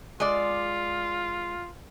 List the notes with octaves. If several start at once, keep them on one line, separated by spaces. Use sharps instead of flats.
G#3 F4 D5